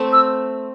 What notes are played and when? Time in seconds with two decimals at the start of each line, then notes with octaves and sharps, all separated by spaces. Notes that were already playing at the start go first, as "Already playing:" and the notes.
Already playing: A3 C4
0.13 E6